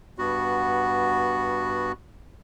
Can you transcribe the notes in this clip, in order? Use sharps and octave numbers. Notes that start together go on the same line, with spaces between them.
G2 B3 F#4